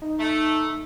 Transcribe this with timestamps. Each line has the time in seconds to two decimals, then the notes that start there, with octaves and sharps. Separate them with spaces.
0.02 D#4
0.20 A3